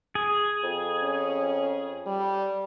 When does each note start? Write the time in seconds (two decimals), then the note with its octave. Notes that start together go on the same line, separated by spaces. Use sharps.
0.15 G#4
0.63 F2
1.03 C#4
2.06 G3